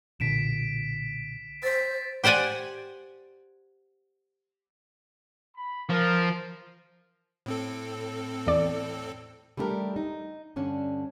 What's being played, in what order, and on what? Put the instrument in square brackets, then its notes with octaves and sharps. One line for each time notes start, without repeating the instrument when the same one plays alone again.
[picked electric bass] B1 A#2 D3 [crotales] B6 D7 E7
[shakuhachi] C5 [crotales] A6 B6
[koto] G4 C5 D5 F#5 G#5
[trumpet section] B5
[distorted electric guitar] F3 [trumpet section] A#4
[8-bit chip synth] A2 C4 A4
[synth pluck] E2 D5
[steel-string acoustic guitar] G3 A3 D4 E4 G4 A#4
D#4
G2 D3 C#4 D4